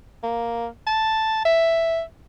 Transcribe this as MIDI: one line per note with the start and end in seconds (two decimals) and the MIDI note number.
0.23 0.67 58
0.86 1.42 81
1.45 2.02 76